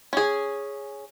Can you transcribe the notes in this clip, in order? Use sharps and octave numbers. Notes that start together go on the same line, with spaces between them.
C#4 G#4